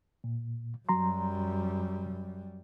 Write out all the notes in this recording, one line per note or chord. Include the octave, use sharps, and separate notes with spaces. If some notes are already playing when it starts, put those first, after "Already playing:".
A#2
F#2 F#3 G3 A#5 C6